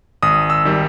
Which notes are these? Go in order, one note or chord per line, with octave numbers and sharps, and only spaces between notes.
G#1 D#6
E6
D#3 G3